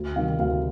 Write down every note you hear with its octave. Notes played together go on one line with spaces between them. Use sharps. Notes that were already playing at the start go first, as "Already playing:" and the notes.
Already playing: D2
C3 D#3 G3 F5
D2 F5